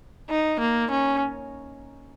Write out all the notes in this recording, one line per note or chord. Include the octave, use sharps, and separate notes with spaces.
D#4
A#3
C#4